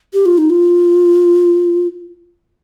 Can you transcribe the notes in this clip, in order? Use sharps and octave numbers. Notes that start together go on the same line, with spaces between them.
G4
F4
D#4
F4